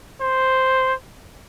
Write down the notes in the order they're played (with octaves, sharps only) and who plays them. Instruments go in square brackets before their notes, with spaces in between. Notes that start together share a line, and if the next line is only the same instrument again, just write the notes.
[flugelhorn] C5